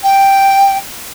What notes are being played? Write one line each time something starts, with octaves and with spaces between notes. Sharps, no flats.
G5